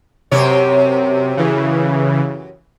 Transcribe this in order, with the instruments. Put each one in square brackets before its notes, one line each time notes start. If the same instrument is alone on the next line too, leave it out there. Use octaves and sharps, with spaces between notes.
[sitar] F#2 G4 C#5 [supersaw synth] C3
[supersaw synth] C#3 E3